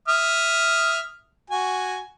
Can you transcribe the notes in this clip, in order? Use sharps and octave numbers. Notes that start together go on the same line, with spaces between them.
E5 D#6 F6
F#4 G#5